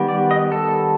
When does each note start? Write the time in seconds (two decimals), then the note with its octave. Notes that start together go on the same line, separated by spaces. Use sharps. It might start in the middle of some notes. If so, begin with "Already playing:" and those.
Already playing: D#3 G3 B3
0.08 D5
0.31 D#5
0.52 A4